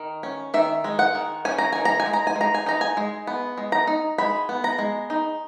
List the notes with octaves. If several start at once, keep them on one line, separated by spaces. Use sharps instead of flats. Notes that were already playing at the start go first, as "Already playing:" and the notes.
Already playing: D#3
C#4
D#3 E5
G#3
F#5
D#3
C#4 G#5
A#5
D#3 G#5
A#5
G#5
G#3
A#5
G#5
G#3
A#5
G#5
D#4 A#5
G#5
G#3
B3
G#3
A#5
D#4
G#3 B5
B3
A#5
G#3
D#4